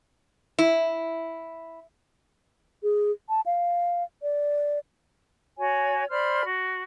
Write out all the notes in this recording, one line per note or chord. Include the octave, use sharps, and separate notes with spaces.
E4
G#4
A5
F5
D5
F#4 C#5 G#5
C5 D5 B5 F6
F#4